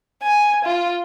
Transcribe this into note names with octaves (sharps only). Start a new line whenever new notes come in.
G#5
F4